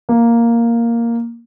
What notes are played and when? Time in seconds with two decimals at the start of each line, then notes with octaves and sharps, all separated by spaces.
0.09 A#3